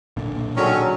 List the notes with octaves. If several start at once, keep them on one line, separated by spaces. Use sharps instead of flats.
B1 A#2 D3
D#3 F#3 G#3 C#4 D4 F#4 A4